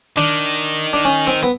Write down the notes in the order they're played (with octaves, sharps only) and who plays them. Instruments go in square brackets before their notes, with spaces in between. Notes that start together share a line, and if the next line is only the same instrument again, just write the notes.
[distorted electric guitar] D#3 [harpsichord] D4
[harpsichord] D4
C#4
C4
B3